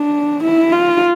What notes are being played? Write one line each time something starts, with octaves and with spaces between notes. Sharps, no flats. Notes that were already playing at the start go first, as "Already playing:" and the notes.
Already playing: D4
E4
F4